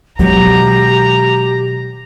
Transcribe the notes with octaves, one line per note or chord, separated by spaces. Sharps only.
B2 D#3 F#3 G#3 G4 A#5